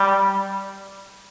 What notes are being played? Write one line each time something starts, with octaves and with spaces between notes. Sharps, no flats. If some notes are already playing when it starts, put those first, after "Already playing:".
Already playing: G3